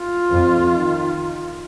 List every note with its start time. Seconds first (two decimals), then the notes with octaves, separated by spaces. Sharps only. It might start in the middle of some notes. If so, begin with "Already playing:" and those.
Already playing: F4
0.30 F2
0.73 D#3